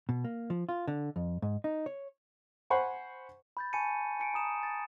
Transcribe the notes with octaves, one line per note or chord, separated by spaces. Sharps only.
B2
A#3
F3
F4
D3
F2
G#2
D#4
C#5
C5 F#5 G#5 B5 C#6
B5 G6 A6
G#5 A5 B5 C#6 C#7 D#7
G#5 C#7 D7
A#5 D#6 E7
A6